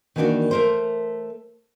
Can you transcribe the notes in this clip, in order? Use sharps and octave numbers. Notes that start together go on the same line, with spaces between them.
D#3 E3 A#3 C#4 D4 F#4
A3 A#4 C5